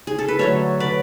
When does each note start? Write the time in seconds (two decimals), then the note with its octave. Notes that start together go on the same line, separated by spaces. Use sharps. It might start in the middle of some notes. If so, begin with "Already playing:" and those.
0.07 G#4
0.19 A4
0.28 B4
0.39 D3 F#3 A3 A4 C#5
0.80 B4 D5